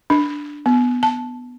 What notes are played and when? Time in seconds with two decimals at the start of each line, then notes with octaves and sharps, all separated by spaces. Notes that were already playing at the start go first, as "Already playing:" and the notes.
0.10 D4
0.66 B3
1.03 A5